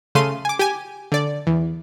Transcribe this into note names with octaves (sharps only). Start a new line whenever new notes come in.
C#3 A3 F5 C6 D#7
G#5 D6
G4 G#5
D3 D5
E2